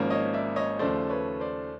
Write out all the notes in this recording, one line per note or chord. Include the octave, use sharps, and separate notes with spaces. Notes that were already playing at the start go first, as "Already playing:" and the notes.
Already playing: G#1 G#2 F3 A#3 C#4
C#5 D#5
D5 E5
C#5 D#5
D#2 C#3 F3 A3 C5 D5
B4 C#5
C5 D5